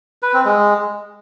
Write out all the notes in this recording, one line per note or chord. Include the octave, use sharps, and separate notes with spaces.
B4
C4
G#3